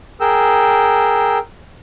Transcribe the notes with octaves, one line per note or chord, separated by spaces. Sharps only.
G#4 A#4 G5 E6